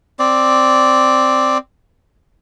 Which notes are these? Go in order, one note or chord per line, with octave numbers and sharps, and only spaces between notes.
C4 D5